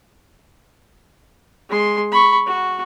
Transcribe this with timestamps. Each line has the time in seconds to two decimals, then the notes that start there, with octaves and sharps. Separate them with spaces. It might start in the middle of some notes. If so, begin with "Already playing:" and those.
1.70 G#3 C6
2.12 B5 C#6
2.47 F#4